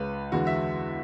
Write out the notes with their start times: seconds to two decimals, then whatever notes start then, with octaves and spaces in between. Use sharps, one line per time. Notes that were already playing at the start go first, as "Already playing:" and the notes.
Already playing: C#2 C#3 G#3 B4
0.32 E2 D3 G#3 B3 F#4
0.47 E5